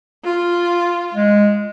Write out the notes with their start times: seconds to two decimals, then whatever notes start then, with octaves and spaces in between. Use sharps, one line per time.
0.24 F4
1.14 G#3